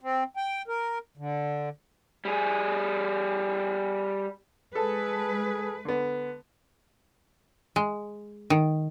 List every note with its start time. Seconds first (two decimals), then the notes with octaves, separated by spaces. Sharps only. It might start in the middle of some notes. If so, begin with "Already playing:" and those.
0.01 C4
0.37 G5
0.68 A#4
1.17 D3
2.25 G3 G#4
4.75 G#3 G#4 A4 B4
5.85 D3 B3
7.76 G#3
8.50 D#3